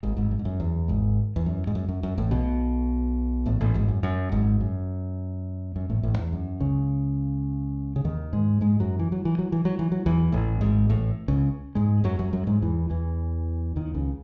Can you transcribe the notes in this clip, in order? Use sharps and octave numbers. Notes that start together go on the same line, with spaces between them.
G#1 G#2
G#1 G#2
F#2
G#2
F#2
E2
G#1 G#2
E2
F#2
G#2
F#2
F#2
F#2
A1 A2
B1 B2
A1 A2
A1 A2
G#1 G#2
F#2
F#2
G#1 G#2
F#2
F#2
A1 A2
A1 A2
E2
F#2
C#2 C#3
C#3
D#2 D#3
G#2 G#3
G#2 G#3
F#2 F#3
E3
F#3
E3
F#3
E3
F#3
E3
F#3
E2 E3
A1 A2
G#1 G#2
A1 A2
C#2 C#3
G#2 G#3
F#2 F#3
F#2 F#3
F#2 F#3
G#2 G#3
E2 E3
E2 E3
D#2 D#3
C#2 C#3